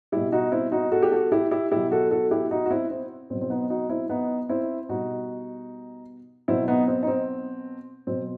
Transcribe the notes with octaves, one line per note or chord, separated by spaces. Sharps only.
B2 G3 E4 G4
D#4 F#4
C4 E4
D#4 F#4
F#4 A4
G4
F#4 A4
E4 G4
E4 G4
B2 F#3 E4 G4
F#4 A4
F#4 A4
E4 G4
D#4 F#4
F#4
C4 E4
C4
B2 F#3 C4
C4
B3 D#4
D#4 F#4
C4 E4
B3 D#4
C4 E4
B2 G3 D#4 F#4
B2 F#3 C4 E4
B3 D#4
C4
D#4
C4
B2 F#3 C4